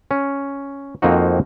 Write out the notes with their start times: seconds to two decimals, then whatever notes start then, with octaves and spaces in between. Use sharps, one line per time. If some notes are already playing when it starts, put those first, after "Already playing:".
0.11 C#4
1.02 F2 A#3 C4 D#4 F#4